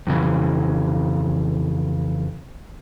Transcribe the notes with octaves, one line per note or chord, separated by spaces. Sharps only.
F2 C#3 E3